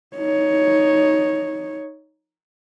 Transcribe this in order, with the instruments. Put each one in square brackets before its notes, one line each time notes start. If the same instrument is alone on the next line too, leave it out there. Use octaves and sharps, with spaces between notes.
[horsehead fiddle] D#4 C#5